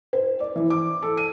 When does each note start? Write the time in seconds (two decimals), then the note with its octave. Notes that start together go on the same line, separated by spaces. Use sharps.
0.13 C5
0.40 D5
0.56 E3
0.70 D6
1.02 A4
1.17 D#7